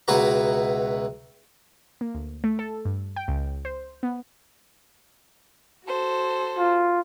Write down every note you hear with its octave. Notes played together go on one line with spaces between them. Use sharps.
C#2 B2 E4 F#4 B4 A#5
A#3
D2
A3
A4
G2
G5
C#2
C5
B3
F#4 A4 C5
F4